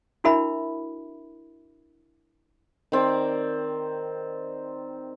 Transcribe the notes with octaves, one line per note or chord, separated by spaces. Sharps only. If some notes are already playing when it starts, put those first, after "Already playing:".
D4 E4 F#4 A#4 E5 B5
D#3 C4 D5 D6